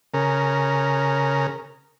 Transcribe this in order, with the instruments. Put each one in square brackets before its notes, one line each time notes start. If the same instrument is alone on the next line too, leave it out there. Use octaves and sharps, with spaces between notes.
[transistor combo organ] C#3 A#4